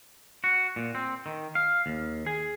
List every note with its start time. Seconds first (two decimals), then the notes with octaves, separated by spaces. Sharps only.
0.44 F#4
0.76 A#2
0.95 C4
1.26 D#3
1.55 F5
1.86 D#2
2.26 G#4